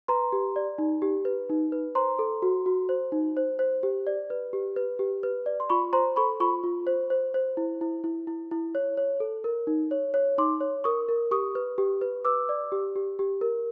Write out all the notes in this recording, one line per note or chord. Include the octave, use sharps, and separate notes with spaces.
B4 A#5 C6
G4
D5
D#4
G4
B4
D#4
B4
C5 A#5 C6
A4
F#4
F#4
C5
D#4
C5
C5
G4
D5
B4
G4
B4
G4
B4
D5
C6
F4 B5 C#6
C5 A#5 C6
A4 B5 C#6
F4 B5 C#6
F4
C5
C5
C5
E4
E4
E4
E4
E4
C#5
C#5
A4
A#4
D#4
C#5
C#5
D#4 C6 D6
C#5
A#4 C#6 D#6
A#4
G4 C#6 D#6
B4
G4
B4
B4 D6 E6
D5
G4
G4
G4
A#4